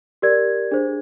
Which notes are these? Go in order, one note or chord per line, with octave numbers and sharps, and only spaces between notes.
G4 A#4 D5 G#6
D4 G#4 C5